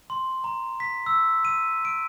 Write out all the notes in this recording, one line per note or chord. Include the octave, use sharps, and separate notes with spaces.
C6
A#5
B6
E6
D#7
D7